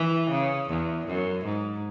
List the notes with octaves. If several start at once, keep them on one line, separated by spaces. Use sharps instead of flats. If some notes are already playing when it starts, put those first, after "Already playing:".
Already playing: E3
C#3
E2
F#2
G#2